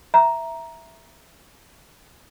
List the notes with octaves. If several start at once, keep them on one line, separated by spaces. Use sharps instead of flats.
E5 A#5